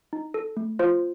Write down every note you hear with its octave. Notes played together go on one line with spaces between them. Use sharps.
D#4
A4
A3
F4 C5